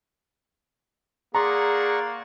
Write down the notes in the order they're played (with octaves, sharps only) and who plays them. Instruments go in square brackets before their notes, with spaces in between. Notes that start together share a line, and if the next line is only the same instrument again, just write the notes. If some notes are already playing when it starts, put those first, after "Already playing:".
[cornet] A#3 [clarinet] G#4 [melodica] D5 F#5 C#6 [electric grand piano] A#5 C6